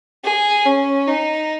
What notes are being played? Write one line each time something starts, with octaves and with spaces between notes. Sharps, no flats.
G#4
C#4
D#4